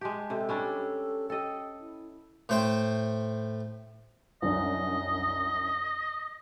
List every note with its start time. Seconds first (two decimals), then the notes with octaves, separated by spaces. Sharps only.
0.01 G#3 G4 A5
0.30 C3 A4
0.49 G3 C#4 D4
1.30 A4 D#5 G5
1.80 E4
2.49 A2 C5 G5
4.42 C2 F#2 D4 D#5